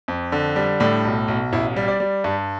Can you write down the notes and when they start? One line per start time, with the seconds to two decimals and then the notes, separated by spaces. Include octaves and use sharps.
0.08 F2
0.32 D3
0.56 G3
0.80 A2 D4
1.05 B1
1.28 B1
1.53 A1 E4
1.76 G3
1.88 D5
2.00 G3
2.24 G2